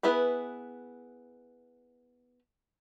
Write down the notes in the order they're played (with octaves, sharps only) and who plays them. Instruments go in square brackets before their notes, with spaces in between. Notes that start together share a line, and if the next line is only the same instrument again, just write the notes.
[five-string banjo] B3 E4 G#4 B4